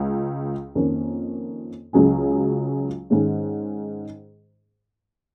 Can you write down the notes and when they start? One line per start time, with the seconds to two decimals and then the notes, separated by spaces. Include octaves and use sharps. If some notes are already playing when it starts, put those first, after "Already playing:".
Already playing: C#2 C#3
0.75 F2 D#3 A#3 C#4
1.93 C#2 C#3 F#3 C#4 G#4
3.10 G#2 D#3 G#3 C#4